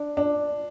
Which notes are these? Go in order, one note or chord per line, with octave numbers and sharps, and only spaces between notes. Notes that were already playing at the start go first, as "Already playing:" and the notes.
Already playing: D4
D4